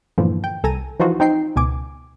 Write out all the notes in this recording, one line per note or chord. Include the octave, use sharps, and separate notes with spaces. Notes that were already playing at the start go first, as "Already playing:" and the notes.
E2 G2 A#2 D3 E3 F3
G5
C2 A4 G#5 A#5 D#7
E3 F3 D#4 F4 F#4
C4 D#4 G5 C7
C#2 B2 G#5 D6